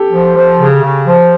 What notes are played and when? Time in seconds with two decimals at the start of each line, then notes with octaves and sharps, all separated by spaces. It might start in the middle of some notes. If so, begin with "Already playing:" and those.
Already playing: G4 A4
0.12 F3
0.35 F3
0.59 C#3
0.83 C#3
1.06 F3